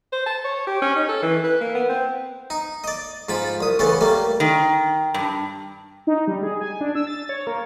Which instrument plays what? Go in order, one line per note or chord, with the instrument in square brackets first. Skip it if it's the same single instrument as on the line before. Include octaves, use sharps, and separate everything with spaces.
[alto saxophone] C5
A5
C#5
G4
C#4
D#4
A4
E3
B4
A#3
B3
C4
[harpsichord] D#4
D5 D#5
G#2 F3 A5 B5
C2 D#6
C#3 E3 A3 B3 A4
G3 A3 A#3
[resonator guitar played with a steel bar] D#3
G2
[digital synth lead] D#4
G3
G#4
G#5
D4
E6
A6
C#5
A#3